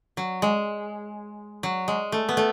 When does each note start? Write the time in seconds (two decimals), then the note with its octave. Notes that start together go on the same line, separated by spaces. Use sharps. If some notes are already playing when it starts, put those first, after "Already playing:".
0.17 F#3
0.42 G#3
1.63 F#3
1.88 G#3
2.12 A3
2.29 B3
2.37 A3